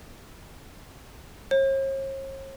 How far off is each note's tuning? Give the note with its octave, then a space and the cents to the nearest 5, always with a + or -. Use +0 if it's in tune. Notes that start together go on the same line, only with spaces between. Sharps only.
C#5 -45